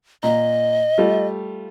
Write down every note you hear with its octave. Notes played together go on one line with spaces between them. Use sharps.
A#2 D#5 A#5
G3 A3 F4